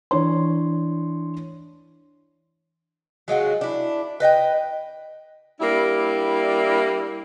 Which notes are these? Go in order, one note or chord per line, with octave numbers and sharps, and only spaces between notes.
E3 D4 C#5 C6
F#3 G#3 F4 F#4
D4 E4
B4 D#5 F#5 G5
G3 A#3 D4 E4